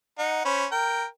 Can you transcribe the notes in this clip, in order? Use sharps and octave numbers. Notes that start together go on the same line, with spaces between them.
D#4 F#5
C#4 C5 B5
A#4 G5